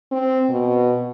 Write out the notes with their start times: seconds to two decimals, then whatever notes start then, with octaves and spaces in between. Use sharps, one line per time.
0.12 C4
0.50 B2